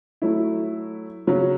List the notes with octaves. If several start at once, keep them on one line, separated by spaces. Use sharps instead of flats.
F#3 A3 E4
C#3 F#3 C#4